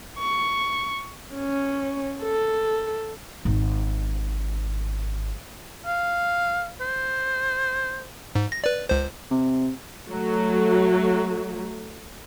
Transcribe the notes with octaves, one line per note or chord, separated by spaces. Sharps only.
C#6
C#4
A4
G#1 D#4
F5
C5
G#2
A#6
B4 D5
C#2 C5
C3
F#3 A3